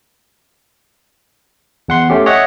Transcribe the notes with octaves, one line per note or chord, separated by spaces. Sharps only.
E2 F#5 C6
A3 C#4 G4
C#5 D#5 E5 F#5